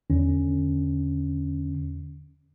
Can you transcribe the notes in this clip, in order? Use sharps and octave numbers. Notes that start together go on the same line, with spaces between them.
E2 D3 C#4